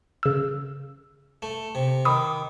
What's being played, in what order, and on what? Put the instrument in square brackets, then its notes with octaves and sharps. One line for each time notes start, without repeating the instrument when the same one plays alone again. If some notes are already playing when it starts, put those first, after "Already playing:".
[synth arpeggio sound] C#3 E6
[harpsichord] A3
C3
[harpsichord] D#3 [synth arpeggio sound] B5 D6 D#6